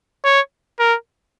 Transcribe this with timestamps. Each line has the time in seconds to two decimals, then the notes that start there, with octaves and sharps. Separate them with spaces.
0.24 C#5
0.79 A#4